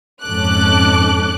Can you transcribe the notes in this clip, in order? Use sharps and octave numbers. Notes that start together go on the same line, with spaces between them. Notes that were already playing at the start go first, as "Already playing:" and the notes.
F2 G#2 C#4 A4 D6 F#6